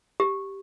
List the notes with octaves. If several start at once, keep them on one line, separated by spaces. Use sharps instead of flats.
G4